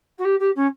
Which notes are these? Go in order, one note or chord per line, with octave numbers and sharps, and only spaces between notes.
F#4
G4
G4
C#4